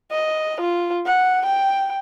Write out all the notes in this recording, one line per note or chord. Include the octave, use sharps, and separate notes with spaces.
D#5
F4
F#5
G5